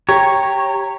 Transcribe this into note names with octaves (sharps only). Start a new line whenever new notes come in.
G4 C#5 A#5